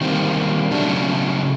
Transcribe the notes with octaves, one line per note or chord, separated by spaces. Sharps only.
D#3 G3 A#3 C4
B2 D3 F#3 A3 D4
C#3 C#4